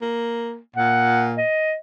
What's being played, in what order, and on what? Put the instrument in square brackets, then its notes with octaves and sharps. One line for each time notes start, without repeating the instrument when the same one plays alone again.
[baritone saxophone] A#3
[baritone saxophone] A#2 [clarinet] F#5
[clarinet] D#5